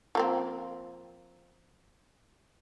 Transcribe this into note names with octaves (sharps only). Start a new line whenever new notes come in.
F3 A#3 C4